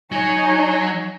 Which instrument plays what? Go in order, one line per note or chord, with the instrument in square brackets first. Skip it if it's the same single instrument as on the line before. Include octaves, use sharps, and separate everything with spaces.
[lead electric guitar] F#3 [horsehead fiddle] D#4 C#5 [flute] G#5